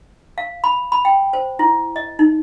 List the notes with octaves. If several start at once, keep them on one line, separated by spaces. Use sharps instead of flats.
F5
B5
B5
G5
C5
E4
D#5
D#4